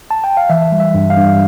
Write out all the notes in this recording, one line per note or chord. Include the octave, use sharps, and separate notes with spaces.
A5
G5
F5
E3 E5
G3
E5
G2
F5
G2